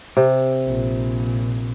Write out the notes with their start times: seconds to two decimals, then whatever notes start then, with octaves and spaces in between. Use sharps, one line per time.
0.17 C3
0.66 A#1 A#2